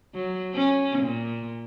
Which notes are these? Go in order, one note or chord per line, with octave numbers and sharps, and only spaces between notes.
F#3
C#4
A#2